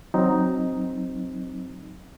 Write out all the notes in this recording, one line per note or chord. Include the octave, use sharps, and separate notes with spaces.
F#3 C4 D#4